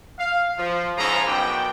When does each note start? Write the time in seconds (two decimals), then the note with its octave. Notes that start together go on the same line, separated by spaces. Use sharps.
0.18 F5
0.58 F3
0.97 G#2 C#3 F3 E4 A4 A#5
1.26 F#2 B2 D4 G5